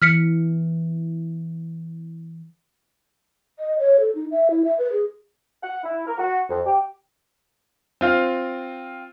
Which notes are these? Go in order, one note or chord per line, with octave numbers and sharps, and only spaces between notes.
E3 F6 B6 C#7
D#5
C#5
A4
D#4
E5
E4
E5
B4
G#4
F#5
E4
A#4
F#4
F2
G4
C4 F4 F5